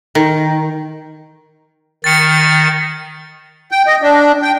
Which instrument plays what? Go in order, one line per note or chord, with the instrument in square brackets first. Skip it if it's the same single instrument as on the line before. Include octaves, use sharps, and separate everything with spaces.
[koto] D#3
[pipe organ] D#3 [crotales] A6 C#7
[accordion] G5
D#5
D4
G5